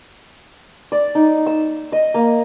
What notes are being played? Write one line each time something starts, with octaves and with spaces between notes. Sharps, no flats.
D5
D#4
E6
D#5
A#3